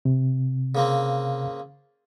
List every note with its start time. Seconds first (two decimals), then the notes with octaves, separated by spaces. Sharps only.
0.05 C3
0.75 C#3 A#3 C4